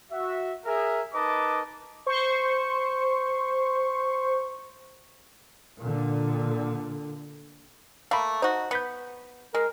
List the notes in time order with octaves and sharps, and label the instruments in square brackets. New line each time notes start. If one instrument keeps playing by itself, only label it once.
[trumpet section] F#4 E5
G#4 A#4 E5
D#4 A#4 B4 D#5 A5 D6
[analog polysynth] C5 C#6
[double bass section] A#2 D3
[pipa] A3 A#3 [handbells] F5 B5
[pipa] D#4 F#4 [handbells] C5
[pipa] B3 [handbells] G6 B6 C#7
[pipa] G#3 [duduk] A#4